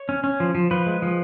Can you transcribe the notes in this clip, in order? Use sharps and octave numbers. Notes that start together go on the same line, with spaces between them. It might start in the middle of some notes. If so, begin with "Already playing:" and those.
Already playing: C#5
C#4
C#4
F3
F3
F3 B4
G#3
F3